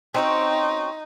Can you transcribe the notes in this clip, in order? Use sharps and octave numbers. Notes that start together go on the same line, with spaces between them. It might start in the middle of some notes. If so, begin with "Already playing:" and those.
C4 C#4 D#4 F#4